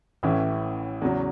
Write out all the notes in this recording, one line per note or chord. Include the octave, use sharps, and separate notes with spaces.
A1 A2 E3 C#4 E4
E2 C#3 F#3